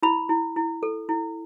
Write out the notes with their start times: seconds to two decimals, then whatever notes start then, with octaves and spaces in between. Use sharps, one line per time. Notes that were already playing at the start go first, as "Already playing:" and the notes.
0.03 E4 B5
0.29 E4
0.56 E4
0.83 A4
1.09 E4